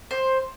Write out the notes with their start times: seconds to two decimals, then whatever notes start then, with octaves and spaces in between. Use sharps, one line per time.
0.11 C5